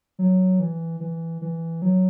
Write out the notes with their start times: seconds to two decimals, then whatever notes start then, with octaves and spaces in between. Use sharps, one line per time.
0.19 F#3
0.60 E3
1.00 E3
1.42 E3
1.82 F#3